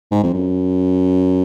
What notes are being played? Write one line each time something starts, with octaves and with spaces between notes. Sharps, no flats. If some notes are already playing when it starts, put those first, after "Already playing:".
G#2
F2
F#2